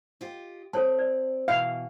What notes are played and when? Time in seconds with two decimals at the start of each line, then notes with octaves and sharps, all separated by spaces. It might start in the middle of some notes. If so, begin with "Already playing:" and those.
0.21 F4 G4 D#5
0.73 C4 A4 C#5 A5
0.99 D5
1.48 B2 E3 E5 F5